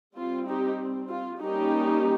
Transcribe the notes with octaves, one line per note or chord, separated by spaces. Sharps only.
G3 C4 F4
D#4 G4
F4
G3 A#3 C#4 D#4 G4